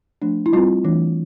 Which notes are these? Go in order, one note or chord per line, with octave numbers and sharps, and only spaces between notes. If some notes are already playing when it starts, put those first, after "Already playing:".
F3 A3 D4
E4
G3 C4 F4
E3 A3 D4